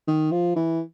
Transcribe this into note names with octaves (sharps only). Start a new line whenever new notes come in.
D#3
F3
E3